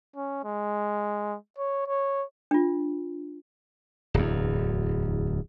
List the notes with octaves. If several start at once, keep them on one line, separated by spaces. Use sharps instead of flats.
C#4
G#3
C#5
C#5
D4 F4
D1 E2